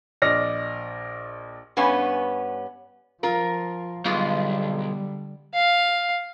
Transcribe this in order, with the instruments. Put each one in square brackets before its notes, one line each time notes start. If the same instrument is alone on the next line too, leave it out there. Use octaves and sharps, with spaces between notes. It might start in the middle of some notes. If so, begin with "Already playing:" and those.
[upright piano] A#1 D5 D#5 F6 A#6
[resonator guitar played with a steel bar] G2 B3 C#4 G#5
[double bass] F3 [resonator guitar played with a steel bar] F4 A#4
[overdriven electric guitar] B1 [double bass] D3 G3 [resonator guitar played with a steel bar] G#3 B3 F4
[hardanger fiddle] F5